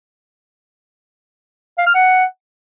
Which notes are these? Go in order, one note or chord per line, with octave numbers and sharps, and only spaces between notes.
F5
F6
F#5